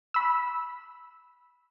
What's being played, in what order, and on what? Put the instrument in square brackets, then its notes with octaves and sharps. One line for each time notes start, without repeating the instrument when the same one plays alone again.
[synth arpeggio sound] B5 E6